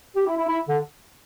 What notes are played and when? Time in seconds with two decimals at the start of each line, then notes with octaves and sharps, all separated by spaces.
0.16 G4
0.27 E4
0.37 E4
0.48 E4
0.69 D3